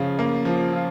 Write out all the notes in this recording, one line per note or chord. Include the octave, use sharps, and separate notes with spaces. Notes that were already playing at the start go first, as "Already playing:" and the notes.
Already playing: C#3 F3 F4
A#3
F3
F4